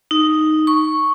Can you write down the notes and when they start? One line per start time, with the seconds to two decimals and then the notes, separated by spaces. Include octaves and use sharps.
0.11 D#4
0.67 C#6